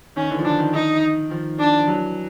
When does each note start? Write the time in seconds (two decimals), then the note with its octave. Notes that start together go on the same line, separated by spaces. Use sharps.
0.16 D#3 C#4
0.30 D3 E3
0.39 F3
0.44 D3 E3 D4
0.59 D#3
0.74 D#4
1.30 D#3 F3
1.59 D4
1.79 F3
1.88 E3 F#3